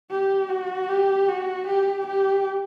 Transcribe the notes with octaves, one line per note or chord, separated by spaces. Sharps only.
G4
F#4
G4
F#4
G4
G4